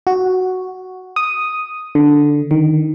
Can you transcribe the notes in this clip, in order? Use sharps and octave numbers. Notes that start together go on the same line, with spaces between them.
F#4
D#6
D3
D#3